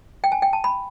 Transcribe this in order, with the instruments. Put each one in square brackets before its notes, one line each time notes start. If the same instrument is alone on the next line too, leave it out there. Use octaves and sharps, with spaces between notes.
[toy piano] G5
G#5
G5
A5
B5